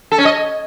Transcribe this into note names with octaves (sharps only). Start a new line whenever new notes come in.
A4
C#4
D#5